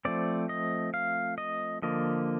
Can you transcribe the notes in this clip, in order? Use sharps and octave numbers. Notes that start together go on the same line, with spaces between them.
F3 A3 C4 D5
D#5
F5
D#5
D3 F3 A#3 D#5